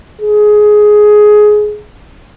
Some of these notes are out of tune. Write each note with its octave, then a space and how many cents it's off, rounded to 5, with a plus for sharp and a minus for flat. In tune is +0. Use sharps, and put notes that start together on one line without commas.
G#4 +15